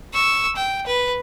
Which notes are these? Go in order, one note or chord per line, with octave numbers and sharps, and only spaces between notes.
C#6 E6
G5
B4